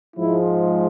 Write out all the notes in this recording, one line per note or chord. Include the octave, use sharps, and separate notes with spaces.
G#2 F3 G#3 E4